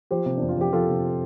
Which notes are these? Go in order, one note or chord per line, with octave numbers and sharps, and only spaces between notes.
F3 G4 C5
C3
F2 D4
F4
F2 G4
F3 F4 A4
C3